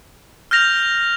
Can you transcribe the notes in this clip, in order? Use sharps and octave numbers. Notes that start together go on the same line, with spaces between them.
F6 G6 A#6 F7